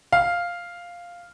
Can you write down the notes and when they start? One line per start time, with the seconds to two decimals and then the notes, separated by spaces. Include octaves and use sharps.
0.12 F5